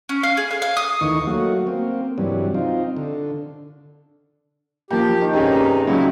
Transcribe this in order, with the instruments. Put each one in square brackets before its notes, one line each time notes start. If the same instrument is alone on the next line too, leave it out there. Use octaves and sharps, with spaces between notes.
[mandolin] C#4
F5
G#4
F5
F5
D#6
[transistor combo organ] D2 D#3 E3 D#4 C#6
F#3 A3 A#3 F#4
A#3 C4
G2 C3 E3 F#3 G3
C4 D#4 F4
D3
[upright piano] F3 A#3 [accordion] G4 [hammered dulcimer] G5 A5
[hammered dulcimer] D#3
[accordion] G2 C3 D#4 [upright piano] C#4 G4 G#4
[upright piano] C#2 F#3 C#4 [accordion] E4